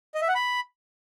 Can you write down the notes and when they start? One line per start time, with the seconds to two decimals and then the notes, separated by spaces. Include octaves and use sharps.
0.15 D#5
0.21 E5
0.28 F#5
0.35 B5